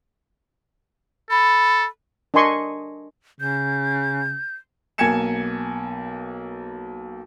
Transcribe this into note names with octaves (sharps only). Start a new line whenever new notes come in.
A4 B5
D4 A#4 D#5 G#5 C6 C#6
C#3 G6
B1 A#3 G#5 G#6 C#7 E7